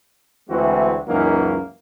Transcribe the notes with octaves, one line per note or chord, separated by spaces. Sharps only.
D2 E3 G#3 C4 E4 F#4
C#2 F#2 E3 F#3 A#3 D#4